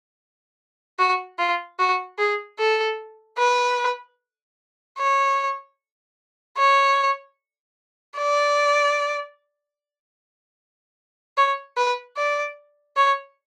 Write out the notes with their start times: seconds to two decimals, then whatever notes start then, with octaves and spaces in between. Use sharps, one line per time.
0.99 F#4
1.39 F4
1.79 F#4
2.19 G#4
2.59 A4
3.38 B4
4.98 C#5
6.58 C#5
8.18 D5
11.37 C#5
11.77 B4
12.17 D5
12.97 C#5